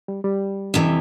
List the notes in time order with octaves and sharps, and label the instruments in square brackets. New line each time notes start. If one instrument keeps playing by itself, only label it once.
[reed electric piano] G3
G3
[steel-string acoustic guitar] F2 C3 E3